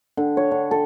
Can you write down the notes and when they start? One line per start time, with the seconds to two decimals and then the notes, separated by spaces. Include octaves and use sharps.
0.17 D3
0.37 C#5
0.51 D3
0.71 A4